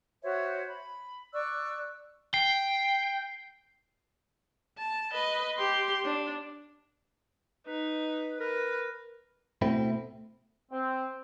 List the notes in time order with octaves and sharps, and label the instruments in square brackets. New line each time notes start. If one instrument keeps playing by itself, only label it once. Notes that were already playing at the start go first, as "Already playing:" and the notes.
[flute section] F#4 C5 C#5 E5
B5
D5 C#6 E6 F#6
[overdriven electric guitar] G5 [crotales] C7
[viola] A5
B4 D#5
G4 C6
D4
[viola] D#4 [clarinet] B4
[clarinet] A#4 [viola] B4
[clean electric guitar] B2 C4 E4 [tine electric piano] A3
[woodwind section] C4